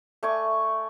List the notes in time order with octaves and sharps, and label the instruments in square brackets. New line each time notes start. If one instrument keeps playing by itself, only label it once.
[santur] A3 D5 G#5 C#6